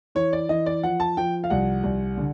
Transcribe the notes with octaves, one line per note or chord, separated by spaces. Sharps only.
E3 C#5
D5
E3 D#5
D5
F3 F#5
A5
F3 G5
F5
C2 F#5
C2
D3